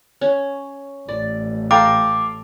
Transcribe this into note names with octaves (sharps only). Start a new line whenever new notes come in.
C#4
A1 D5
A4 F5 G5 A#5 D6